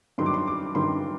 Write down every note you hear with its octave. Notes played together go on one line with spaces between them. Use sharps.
G2 D#3 F#3 C6
D6
C6
D6
G2 D#3 F#3 C6